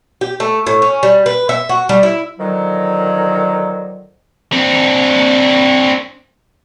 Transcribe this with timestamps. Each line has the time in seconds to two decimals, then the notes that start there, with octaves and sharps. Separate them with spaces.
0.21 G4
0.40 A3
0.67 A2
0.82 C#4
1.03 G3
1.26 B4
1.49 E5
1.69 F#4
1.89 G3
2.03 E4
2.39 D3 D#3 F3 F#3
4.53 C4 D4